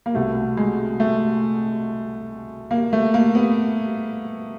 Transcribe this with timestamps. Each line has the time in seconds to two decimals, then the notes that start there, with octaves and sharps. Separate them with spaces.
0.06 A#3
0.14 C2 B2 A3
0.57 G#3
1.00 A3
2.71 A#3
2.93 A3
3.14 A#3
3.35 B3